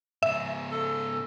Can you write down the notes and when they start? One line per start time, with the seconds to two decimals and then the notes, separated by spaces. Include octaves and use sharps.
0.23 G#2 C#3 E5
0.71 A4